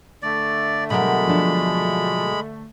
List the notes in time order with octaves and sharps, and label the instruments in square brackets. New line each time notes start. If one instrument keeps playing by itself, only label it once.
[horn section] D3 A3 [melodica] D5
[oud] B2 F#3 A#4 [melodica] G#3 B5
[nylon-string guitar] F3 D4